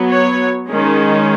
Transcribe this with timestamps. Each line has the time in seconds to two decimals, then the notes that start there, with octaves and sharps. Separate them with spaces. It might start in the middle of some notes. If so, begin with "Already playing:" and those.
Already playing: F#3 B3
0.10 C#5
0.70 D#3 G#3 C#4